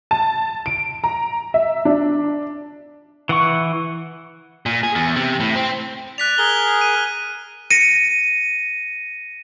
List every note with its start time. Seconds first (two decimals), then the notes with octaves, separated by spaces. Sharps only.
0.11 A5
0.66 D7
1.04 A#5
1.54 E5
1.85 D4
3.29 E3 F#5 C#6
4.66 A#2
4.83 G#4
4.95 E2
5.16 C3
5.40 A2
5.56 C4
6.18 D5 F#6 B6 F7
6.38 G#4 A#4 G7
6.81 D#7
7.71 A#6 C#7 D#7